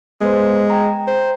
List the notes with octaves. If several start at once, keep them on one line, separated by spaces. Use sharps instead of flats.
G#3 B3 B4 C5
G5 A#5
C5